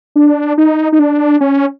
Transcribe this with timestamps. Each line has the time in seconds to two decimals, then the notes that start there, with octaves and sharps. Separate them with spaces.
0.16 D4
0.58 D#4
0.92 D#4
0.99 D4
1.41 C#4